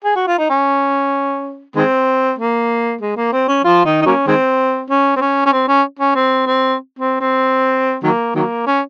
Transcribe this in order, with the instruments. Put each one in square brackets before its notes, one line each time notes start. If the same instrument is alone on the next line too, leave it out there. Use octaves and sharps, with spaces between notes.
[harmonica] G#4
F#4
F4
D#4
C#4
D#3 G#3 C4
A#3
G#3
A#3
C4
C#4
F3 F4
D#3 D#4
D#4
F#3 A#3 C#4
D#3 G#3 C4
C#4
C4
C#4
C#4
C4
C#4
C#4
C4
C4
C4
C4
D#3 F#3 A#3
D#3 F#3 A#3
C#4